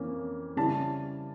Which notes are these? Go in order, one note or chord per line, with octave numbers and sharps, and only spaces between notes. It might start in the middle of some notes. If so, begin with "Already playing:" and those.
Already playing: F2 E3 A#3 C#4
C#3 G3 C#4 E4 A5